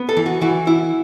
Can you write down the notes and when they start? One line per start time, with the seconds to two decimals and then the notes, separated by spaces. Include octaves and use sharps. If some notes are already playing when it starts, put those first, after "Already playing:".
Already playing: B3
0.09 A4
0.17 E3
0.26 F#4
0.41 E3 F#4
0.67 E4